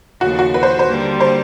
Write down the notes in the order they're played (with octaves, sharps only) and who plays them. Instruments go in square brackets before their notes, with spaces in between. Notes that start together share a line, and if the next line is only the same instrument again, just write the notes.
[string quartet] D#2 C#3 F3 A3 [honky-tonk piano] F#4
[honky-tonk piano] F#4
B4
C5
C5
[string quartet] D3 G3 A#3
[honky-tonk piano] C5